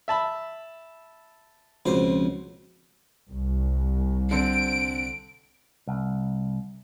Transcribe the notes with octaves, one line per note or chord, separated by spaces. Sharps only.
E5 A5 B5
C#2 B2 F3 C4 C#4 C5
C2
D3 C4 D7
C2